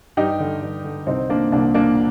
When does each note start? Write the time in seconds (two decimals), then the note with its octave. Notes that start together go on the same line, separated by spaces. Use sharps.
0.17 G2 D#4 G4
0.40 D3
0.62 G2
0.84 D3
1.07 C2 C4 D#4
1.29 A#2 A#3 D4
1.52 C2 A#3 D4
1.74 A#2 A#3 D4